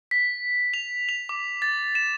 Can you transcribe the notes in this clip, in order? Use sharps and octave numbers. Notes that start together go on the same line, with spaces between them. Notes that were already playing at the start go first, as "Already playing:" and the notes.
B6
F7
F7
D6
A6
E7